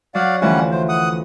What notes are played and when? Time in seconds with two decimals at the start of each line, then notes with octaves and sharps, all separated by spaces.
0.15 F#3 D5 F5 F#5
0.42 D2 E3 F3 G3 C#4 F#5
0.71 C5
0.89 F#5 D#6